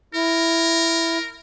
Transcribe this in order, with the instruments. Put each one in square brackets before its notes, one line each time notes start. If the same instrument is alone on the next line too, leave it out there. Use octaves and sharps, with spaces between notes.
[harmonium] E4 [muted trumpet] A#4